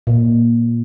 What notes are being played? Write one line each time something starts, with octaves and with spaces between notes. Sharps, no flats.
A#2